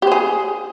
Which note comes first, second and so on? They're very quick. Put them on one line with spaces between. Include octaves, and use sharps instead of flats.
G4 C5 G#4